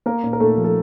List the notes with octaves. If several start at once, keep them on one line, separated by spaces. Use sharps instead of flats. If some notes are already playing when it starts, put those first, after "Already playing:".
A#3 A#4
A#2
A#4
A#2 A3 A4
F3
A4